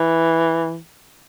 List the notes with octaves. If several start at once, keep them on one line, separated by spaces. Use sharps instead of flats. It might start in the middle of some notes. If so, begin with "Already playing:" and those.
Already playing: E3